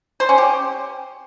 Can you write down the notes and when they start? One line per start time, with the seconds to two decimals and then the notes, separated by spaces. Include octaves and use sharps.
0.20 C5
0.29 C#4
0.38 G4